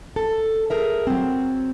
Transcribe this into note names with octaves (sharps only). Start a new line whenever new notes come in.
A4
G#4 A#4 E5
F#3 C4